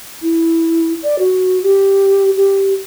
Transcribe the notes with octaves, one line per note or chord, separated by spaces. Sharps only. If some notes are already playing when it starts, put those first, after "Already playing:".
E4
D5
F#4
G4
G4